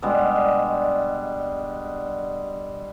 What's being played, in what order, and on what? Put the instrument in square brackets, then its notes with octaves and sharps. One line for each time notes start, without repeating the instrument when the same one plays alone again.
[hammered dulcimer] B2 D3 G3 G#3